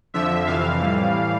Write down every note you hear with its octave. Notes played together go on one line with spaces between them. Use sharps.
F2 D3 F3 E5
F2 C3 E3 F5
A2 E3 G3